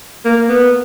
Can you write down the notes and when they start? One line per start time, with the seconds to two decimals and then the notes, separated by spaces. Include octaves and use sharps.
0.25 A#3
0.49 B3